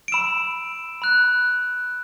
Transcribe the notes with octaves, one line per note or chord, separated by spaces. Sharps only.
D7
B5 E6 E7
B5 F#6